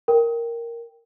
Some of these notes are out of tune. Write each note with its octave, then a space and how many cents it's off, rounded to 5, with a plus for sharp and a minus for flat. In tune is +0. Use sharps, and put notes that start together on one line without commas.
A#4 +0 G5 +0